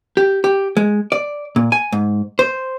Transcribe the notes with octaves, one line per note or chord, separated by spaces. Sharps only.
G4
G4
G#3
D5
A#2
G#5
G#2
C5